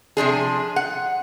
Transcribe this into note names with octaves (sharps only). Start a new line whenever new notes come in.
C3 F3 D4 G#4
F#5